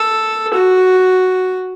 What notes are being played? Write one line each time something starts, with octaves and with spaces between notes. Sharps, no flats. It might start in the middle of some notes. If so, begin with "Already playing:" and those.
Already playing: A4
F#4